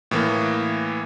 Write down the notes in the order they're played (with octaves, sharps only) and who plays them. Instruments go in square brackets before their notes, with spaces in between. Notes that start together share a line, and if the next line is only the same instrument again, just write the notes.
[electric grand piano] A2 E3 A#3